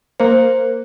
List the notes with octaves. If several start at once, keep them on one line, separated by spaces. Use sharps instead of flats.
A#3 C5